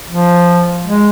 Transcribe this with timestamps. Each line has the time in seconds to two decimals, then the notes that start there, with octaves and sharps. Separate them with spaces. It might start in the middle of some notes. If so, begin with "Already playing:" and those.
0.10 F3
0.85 G#3